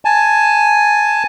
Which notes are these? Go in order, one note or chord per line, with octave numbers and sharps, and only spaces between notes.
G#5 A5